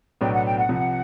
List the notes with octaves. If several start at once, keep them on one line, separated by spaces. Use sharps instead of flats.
B1 A2 F#3 B3 D4 G5
F#5
G5
F#5
C2 C3 F3